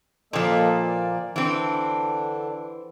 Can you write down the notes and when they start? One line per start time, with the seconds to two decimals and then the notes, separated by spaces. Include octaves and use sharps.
0.33 A#2 F3 A#3 A4 D#5
0.86 A#3 D5
1.36 D3 E3 C4 D4